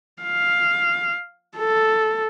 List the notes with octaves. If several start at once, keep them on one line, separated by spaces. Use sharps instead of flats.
F5
A4